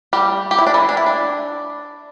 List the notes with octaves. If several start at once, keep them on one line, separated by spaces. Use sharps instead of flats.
G3 G4
G4
E4
D4
E3 E4
D4
E4
D4